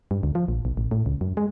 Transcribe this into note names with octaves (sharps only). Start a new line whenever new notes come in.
G2
D2
F3
A#1
B1
A1
A2
C#2
F#2
G#3